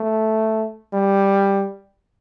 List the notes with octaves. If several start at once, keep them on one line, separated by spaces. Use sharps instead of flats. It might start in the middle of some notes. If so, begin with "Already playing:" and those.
Already playing: A3
G3